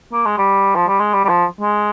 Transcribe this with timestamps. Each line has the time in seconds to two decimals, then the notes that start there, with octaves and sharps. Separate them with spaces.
0.13 A#3
0.26 G#3
0.38 G3
0.75 F3
0.88 G3
1.00 G#3
1.14 G3
1.25 G3
1.29 F3
1.61 G#3